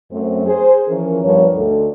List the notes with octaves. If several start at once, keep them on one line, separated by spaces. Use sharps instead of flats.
F#2 A3 C4
G#4 C5
E3 F3 C#4 A#4
G2 F3 B3 A#4 C#5
D2 D3 D#4 A4